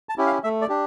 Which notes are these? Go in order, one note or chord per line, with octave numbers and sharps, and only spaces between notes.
A5
C#4 E4 G4
F5
A3 E5
D5
D4 G4